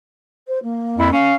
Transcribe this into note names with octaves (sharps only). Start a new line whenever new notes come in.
C5
A#3
F2 E4
C#4 F5